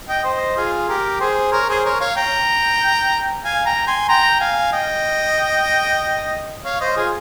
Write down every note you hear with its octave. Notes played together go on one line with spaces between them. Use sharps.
D#5 G5
C5 D#5
F4 G#4
G4 A#4
G#4 C5
A#4 C#5
G#4 C5
A#4 C#5
C#5 F5
G5 A#5
F5 G#5
G5 A#5
G#5 C6
G5 A#5
F5 G#5
D#5 G5
C#5 F5
C5 D#5
F4 G#4